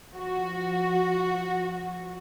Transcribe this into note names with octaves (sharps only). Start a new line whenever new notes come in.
F3 F#4